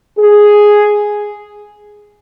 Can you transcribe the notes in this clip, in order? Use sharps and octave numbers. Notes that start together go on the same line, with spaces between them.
G#4